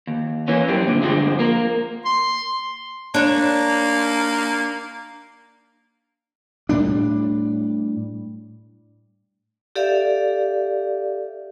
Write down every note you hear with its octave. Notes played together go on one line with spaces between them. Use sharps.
D#2
E3 A#3 C#4
F#2 G3 C4
A#2 D3
G2 D3 F3 G#3 C4
A#3 A#4
C6
A#3 D4 C#5
A2 G3 D4
G4 A4 D5 E5 F5